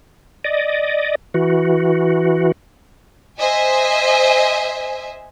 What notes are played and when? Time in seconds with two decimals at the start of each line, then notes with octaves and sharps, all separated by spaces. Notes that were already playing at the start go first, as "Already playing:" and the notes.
0.45 D5 D#5
1.34 E3 F#4
3.39 C5 D#5 E5 G#5